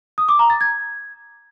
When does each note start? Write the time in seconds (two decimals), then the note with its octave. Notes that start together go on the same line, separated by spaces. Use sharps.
0.18 D#6
0.29 D6
0.39 A#5
0.50 A6
0.61 G#6